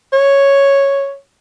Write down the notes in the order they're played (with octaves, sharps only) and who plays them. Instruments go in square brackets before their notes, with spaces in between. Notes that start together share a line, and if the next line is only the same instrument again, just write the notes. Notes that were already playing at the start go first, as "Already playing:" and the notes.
[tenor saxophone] C#5